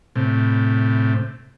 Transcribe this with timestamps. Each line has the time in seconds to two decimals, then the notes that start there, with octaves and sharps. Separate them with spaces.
0.16 A2 C3